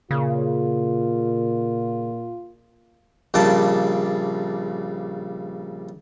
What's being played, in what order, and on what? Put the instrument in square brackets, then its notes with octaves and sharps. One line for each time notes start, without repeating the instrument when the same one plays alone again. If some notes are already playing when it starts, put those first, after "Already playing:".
[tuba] A#2 [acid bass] C#3 [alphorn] F4
[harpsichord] A#1 A#2 C#3 G3 D5 A5